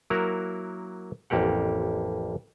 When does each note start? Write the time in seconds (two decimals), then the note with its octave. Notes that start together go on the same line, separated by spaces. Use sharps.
0.10 F#3 A#3 E4 F#4 A#4
1.30 A1 F2 A#3 G4 F#5